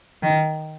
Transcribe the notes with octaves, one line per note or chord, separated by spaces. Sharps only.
D#3